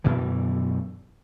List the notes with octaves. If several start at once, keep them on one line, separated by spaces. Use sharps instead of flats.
F#2 B2 D3 E3